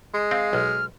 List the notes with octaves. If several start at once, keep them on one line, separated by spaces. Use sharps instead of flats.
G#3
C4 F5
B1 F6